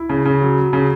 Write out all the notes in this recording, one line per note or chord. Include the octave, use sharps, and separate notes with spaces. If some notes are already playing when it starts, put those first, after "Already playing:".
Already playing: E4
C#3
C#3
F#3
F#3
C#3